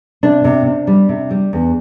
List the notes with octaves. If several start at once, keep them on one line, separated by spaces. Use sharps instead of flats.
C3 D4
C3
C3
G3
C3
G3
E2